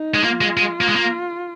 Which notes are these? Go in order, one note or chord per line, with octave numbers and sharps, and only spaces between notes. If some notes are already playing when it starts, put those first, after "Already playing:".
Already playing: D#4
G#3
A#3 F4
G#3
G#3
A#3
G#3
A#3